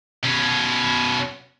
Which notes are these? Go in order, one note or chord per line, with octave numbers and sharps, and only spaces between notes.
B2 C#4